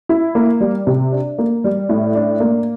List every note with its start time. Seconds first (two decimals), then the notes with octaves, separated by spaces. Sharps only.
0.09 E4
0.35 A#3
0.60 G3
0.87 C3
1.12 D4
1.38 A#3
1.64 G3
1.89 A2
2.15 D4
2.40 A#3